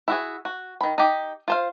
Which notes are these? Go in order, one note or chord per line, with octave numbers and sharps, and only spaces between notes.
E4 F#4 G#4
F#4
D#3 B5
D#4 G4
F4 C5 F5